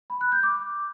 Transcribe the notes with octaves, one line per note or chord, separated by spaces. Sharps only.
B5
F#6
G6
D6